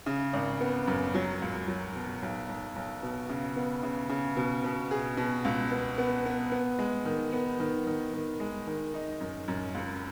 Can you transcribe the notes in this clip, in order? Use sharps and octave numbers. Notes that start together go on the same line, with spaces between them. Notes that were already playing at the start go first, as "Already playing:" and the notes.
C#3
G#1
B3
F#2
F#3
C#2
F#3
B2
B1
B1
B1
B2
C#3
B3
C#3
C#3
B2
B2
G#4
B2
C#2
B3
B3
B3
B3
G#3
D#3
B3
D#3
D#3
D#3
G#3
D#3
D#4
F#2
F#2
C#2